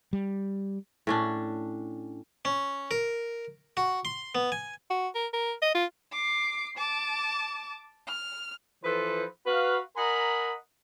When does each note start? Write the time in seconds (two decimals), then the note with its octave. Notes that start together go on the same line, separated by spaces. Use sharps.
0.13 G3
1.07 A2 C#4 D4
2.45 C#4
2.91 A#4
3.77 F#4
4.05 C6
4.35 B3
4.52 G#5
4.90 F#4
5.15 A#4
5.33 A#4
5.62 D#5
5.74 F4
6.12 D6 C7
6.78 A5 D6
8.07 F6
8.84 E3 F3 A4 B4 C5
9.46 F#4 B4 F5
9.97 A#4 D#5 F#5 G#5 A#5 B5